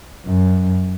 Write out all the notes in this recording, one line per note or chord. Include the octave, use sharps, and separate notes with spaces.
F#2